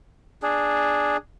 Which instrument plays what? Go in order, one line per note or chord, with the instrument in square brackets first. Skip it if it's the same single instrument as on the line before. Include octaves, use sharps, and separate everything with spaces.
[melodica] D4 G#4